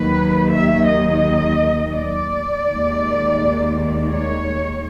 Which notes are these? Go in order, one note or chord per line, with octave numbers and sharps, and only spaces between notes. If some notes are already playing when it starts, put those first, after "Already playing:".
Already playing: D#2 D#3 F#3 B4
E5
D#5
D5
D#2 D#3 G#3
C#5